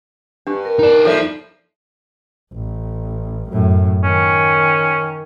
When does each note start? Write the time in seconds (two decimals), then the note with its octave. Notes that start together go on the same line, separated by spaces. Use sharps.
0.47 G2 D4 G4
0.65 A#4
0.79 D#4 D5
1.05 F3 G3 A4 C#5 E5
2.54 A1
3.50 F#2 A2
4.04 D#3 C#4